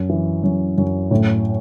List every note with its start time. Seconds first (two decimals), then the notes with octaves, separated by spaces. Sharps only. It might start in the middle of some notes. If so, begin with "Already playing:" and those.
Already playing: F#2
0.10 E3
0.43 F#2
0.78 F#2
1.11 A2